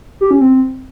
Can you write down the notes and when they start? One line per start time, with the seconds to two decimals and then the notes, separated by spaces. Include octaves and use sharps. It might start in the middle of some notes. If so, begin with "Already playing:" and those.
0.21 G4
0.31 C#4
0.41 C4